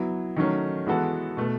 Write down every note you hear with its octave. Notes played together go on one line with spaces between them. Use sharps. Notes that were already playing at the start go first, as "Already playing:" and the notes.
Already playing: F#3 B3 E4
D#3 F#3 A3 C#4
E3 G#3 B3 F#4 A4
B2 A3